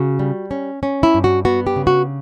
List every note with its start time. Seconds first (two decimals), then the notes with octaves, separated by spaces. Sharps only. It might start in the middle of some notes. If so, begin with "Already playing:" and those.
Already playing: C#3 F#4
0.19 G3
0.51 C#4
0.83 C#4
1.03 E4
1.14 G2
1.24 F#4
1.45 B3 F#4
1.67 G4
1.76 C#3
1.87 F#4